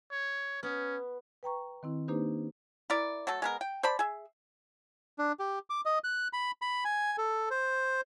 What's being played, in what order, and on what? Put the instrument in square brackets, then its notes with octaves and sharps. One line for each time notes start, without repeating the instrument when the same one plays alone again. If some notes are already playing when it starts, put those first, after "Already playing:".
[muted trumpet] C#5
[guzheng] B3 [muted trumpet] C#4
[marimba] B4 G5 A#5 C#6
D#3 C4 E4
A#3 D4 D#4 G4 B4 C5
[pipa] E4 A#4 D5
F#3 A3 A4
G#3 B3 A#4
G5
C5 D5 A5 B5
G#4 E5
[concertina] D4
G4
D6
D#5
F#6
B5
B5
G#5
A4
C5